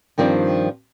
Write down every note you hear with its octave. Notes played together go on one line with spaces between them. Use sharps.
G2 D#3 F3 C4 D4